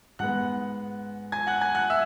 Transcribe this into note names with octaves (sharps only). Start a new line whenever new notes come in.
G#2 G#3 B3 F#5 F#6
G#5 G#6
F#5 F#6
G#5 G#6
F#5 F#6
E5 E6